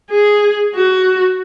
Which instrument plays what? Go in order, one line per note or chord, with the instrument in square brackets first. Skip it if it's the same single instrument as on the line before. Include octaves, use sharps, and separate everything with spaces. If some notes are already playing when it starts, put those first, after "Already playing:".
[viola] G#4
F#4